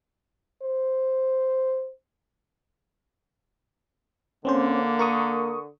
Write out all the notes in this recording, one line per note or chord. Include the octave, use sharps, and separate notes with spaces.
C5
D3 A#3 C4 C#4 C5
A#4 C#6 D#6